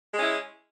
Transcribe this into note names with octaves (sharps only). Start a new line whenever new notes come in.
G#3 C#4 E4